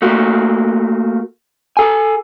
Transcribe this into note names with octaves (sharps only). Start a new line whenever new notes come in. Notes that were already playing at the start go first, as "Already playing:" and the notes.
A3 A#3 F#4
A4 G#5